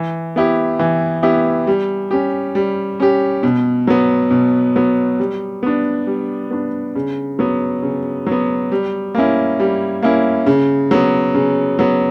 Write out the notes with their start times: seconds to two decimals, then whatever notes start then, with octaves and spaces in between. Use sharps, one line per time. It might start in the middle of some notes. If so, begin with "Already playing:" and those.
Already playing: E3
0.36 B3 E4 G4
0.79 E3
1.23 B3 E4 G4
1.67 G3
2.11 C#4 G4
2.55 G3
3.00 C#4 G4
3.43 B2
3.87 F#3 B3
4.31 B2
4.76 F#3 B3
5.20 G3
5.63 B3 D4
6.07 G3
6.51 B3 D4
6.95 C#3
7.39 F#3 B3
7.82 C#3
8.26 F#3 B3
8.72 G3
9.15 A#3 C#4 E4
9.60 G3
10.02 A#3 C#4 E4
10.46 C#3
10.91 F#3 B3
11.34 C#3
11.79 F#3 B3